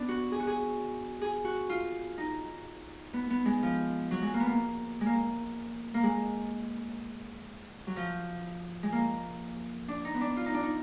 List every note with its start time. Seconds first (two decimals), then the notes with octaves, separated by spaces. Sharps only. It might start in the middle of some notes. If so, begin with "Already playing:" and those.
Already playing: B3 D4
0.08 F#4
0.32 G#4
0.40 F#4
0.47 G#4
1.22 G#4
1.45 F#4
1.70 F4
2.18 D#4
3.13 B3
3.30 B3
3.45 G#3
3.63 F3
4.11 F#3
4.22 G#3
4.34 A#3
4.40 B3
4.46 A#3
5.01 G#3
5.06 A#3
5.94 A#3
6.03 G#3
7.87 F#3
7.96 F3
8.83 G#3
8.92 A#3
9.88 D4
10.05 D#4
10.14 B3
10.21 D4
10.37 F4
10.46 D#4
10.54 D4
10.63 D#4